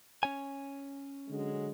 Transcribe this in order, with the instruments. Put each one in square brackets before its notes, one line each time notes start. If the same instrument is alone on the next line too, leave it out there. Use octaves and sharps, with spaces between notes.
[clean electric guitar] C#4 C#5 G#5
[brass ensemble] D3 F#3 G#3